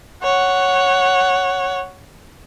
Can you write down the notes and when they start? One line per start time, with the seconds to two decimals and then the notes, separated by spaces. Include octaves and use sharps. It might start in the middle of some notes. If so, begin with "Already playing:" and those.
0.23 C#5 F#5